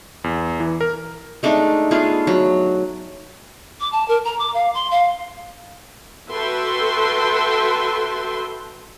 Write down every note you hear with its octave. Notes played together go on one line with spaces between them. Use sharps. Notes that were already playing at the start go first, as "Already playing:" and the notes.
E2
E3
A#4
G#3 A3 D4 D#4
A3 B3 F4 G#4
F#3
D6
A5
A#4
A#5
D6
F5
C6
F5
F#4 A4 B4 E5 G5 C6